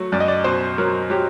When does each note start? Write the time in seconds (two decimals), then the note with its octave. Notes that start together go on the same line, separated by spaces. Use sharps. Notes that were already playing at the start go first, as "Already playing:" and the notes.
Already playing: F#3 A3
0.12 F#2 D5
0.20 D#5
0.28 D5
0.44 B2 C5
0.78 F#3 A#4
1.10 F#3 G4